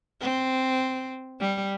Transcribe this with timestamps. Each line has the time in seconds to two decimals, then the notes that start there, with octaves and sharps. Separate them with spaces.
0.20 C4
1.40 G3